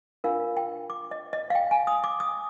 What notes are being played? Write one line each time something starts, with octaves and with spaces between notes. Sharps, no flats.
D4 F4 A#4 F5
G5
D6
D#5
D#5
F5
G5
G#5
D#6
D6
D#6